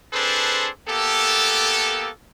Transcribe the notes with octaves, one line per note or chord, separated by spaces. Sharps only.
C4 D4 G#4 A4 B4 C5
A#3 B3 G4 A4